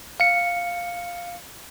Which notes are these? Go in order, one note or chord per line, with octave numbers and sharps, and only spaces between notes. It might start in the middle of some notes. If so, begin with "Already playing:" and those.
F5 C#7